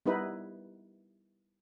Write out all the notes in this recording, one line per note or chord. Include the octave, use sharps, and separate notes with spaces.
G3 B3 D#4 E4 B4